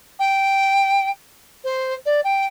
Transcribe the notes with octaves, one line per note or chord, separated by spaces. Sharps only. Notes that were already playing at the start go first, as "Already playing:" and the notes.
G5
C5
D5
G5